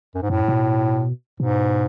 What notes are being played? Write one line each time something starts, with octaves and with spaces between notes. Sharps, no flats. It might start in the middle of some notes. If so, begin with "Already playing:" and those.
F#2
G#2
F#2 A2
B2
G#2 B2